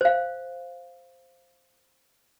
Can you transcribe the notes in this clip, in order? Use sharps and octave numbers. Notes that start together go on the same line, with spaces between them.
C5 F5